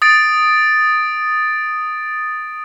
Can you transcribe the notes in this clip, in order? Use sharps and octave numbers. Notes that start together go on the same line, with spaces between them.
D#6 A6 D7